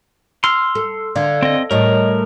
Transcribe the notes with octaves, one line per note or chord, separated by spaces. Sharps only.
C6 E6 F6
A4
D3 D5 F5 G#6
C4 D#5
A2 G3 A#4 C#5 D#5